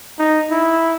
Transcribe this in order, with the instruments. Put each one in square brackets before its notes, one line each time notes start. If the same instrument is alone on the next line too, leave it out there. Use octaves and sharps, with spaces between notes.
[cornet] D#4
E4